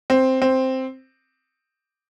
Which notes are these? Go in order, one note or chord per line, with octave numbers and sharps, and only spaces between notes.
C4
C4